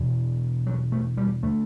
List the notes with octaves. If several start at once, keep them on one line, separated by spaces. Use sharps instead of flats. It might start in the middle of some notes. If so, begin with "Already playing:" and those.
Already playing: E2 B2
F#3
A3
G3
D3 A3